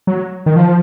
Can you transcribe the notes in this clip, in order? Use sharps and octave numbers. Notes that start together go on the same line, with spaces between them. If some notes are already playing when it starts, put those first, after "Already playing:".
F#3
D#3
F3